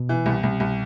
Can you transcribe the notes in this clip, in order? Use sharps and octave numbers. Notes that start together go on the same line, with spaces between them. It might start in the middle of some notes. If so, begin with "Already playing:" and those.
Already playing: B2
E3
C2
C2
C2